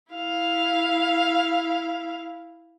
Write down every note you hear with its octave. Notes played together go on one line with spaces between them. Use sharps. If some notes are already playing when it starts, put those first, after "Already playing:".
E4 F5